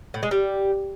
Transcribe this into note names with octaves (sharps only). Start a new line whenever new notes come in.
A2
G#3
G3